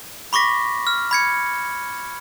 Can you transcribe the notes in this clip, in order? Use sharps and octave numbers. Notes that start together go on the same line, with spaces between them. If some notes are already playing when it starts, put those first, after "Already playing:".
B5 C#6 D6 A#6 B6
F6
B5 G#6 C#7